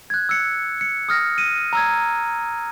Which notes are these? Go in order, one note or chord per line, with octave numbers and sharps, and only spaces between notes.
F#6 G#6
E6 C#7
C#7
D#6 F6 A#6
D#7
A#5 E6 G#6